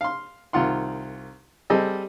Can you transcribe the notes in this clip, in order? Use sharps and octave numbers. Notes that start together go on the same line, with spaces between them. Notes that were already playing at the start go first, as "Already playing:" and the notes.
F5 C6
C2 D#3 F4 F#5 C6
G3 C4 G#4 A4 D#5